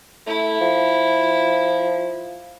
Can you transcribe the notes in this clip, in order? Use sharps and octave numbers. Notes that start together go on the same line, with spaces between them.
A3 E4
F3